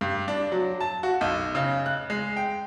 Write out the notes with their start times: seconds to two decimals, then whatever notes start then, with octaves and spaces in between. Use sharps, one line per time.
0.01 G2
0.28 D4
0.52 F#3
0.81 A5
1.03 F#4
1.21 B1
1.55 C#3
1.86 F#6
2.10 G#3
2.37 G5